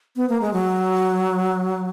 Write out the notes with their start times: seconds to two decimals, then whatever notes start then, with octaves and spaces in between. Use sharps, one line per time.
0.16 B3
0.29 A#3
0.42 G#3
0.53 F#3